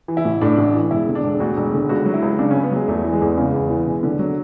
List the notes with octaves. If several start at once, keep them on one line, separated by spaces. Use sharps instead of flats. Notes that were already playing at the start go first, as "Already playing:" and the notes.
E3
E4
A1
A2 D4
A1
E3
E1 E4
D3
D4
E1
D2 F#4
E1
D3
C#2 F#4
F#3
E4
C#2
C#3 D4
C#4
C#2
B3
F#3 G#3
E2 A3
E3
G#3
E2
C#3
E2
E3
E1
D3
F#3